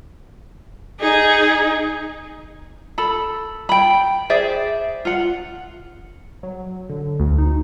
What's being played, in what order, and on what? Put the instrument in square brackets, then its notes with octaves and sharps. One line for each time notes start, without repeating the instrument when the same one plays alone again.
[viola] D#4 G#4
[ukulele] A4 B5
G5 B5
G#4 C5 D5 E5
F4 F#5
[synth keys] F#3
D3
D2
D#4